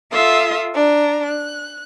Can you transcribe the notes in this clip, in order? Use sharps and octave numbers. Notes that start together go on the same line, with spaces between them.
F4 A4 E5 F5 D#6
D4 A#5
F#6